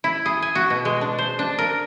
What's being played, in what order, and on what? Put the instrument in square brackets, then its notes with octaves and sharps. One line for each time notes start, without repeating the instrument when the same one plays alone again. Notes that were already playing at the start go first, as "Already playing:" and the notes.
[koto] E4
G#4
G#5
F#4
B2
G#3
D4
C5
D4
A#4